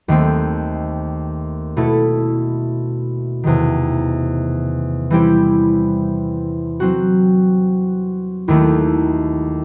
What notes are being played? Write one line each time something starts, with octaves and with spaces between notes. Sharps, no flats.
D#2 D#3 A3 C4
B2 A3 E4 A4
E2 C3 D#3
E3 G3 C4 E4 G4
F#3 C4 F#4
D#2 D#3 A3 E4